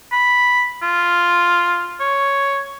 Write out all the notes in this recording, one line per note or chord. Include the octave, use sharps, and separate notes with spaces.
B5
F4
C#5